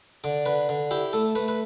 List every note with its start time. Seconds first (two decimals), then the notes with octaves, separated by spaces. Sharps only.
0.24 D3 D5
0.46 D3 B4
0.69 D3
0.91 E4 G4
1.13 A3 A4
1.35 A3 B4
1.48 B4